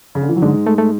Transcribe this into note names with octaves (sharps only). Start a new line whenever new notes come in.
C#3
D3
E3
F#3
G#2 D3 G#3
A3
A3